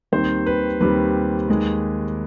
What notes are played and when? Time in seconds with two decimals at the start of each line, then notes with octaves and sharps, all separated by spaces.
0.12 D#2 D#3 G3 C4 C5
0.46 B4
0.81 D#2 D#3 G3 C4 B4
1.49 D#2 D#3 G#3